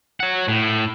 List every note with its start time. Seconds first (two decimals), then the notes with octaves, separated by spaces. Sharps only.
0.20 C#5 F#5
0.49 A2